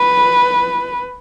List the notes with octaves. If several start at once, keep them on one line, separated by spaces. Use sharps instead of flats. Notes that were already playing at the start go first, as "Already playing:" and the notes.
Already playing: B4